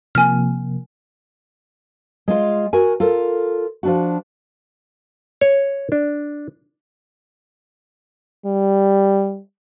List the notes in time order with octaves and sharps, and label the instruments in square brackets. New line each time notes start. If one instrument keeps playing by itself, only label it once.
[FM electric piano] C3 F3 A#3 [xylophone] G#5 F6
[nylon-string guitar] G#3 F4
F#4 A#4 G#5
F4 A4 A#4
F3 D4 F#4
[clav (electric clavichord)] C#5
D4
[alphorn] G3